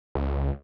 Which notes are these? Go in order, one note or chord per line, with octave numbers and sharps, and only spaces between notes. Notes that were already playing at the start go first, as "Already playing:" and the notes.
C#2